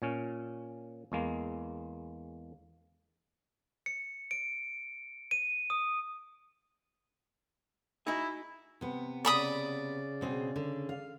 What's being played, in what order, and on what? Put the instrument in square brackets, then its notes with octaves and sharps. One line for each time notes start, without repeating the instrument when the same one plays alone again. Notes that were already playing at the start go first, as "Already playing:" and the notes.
[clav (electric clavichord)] A#2 C#4
E2 G#3 A#3
[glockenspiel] C#7
D7
D#7
D#6
[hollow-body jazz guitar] D#4 F#4 G#4 [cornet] E4
[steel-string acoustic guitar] C3 B3
[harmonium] C#3 [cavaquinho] D5 B5 D#6
[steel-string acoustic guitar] B2 C4 G#4
D3
F5